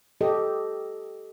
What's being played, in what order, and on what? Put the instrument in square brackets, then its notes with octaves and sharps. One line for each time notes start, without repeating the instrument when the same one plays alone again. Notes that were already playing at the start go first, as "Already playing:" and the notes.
[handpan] G4 A4 D#5